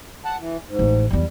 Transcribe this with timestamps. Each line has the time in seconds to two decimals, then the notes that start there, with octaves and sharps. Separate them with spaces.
0.25 F#5 A5
0.39 E3
0.67 G#2
0.79 A1
1.10 E2 F#3 G3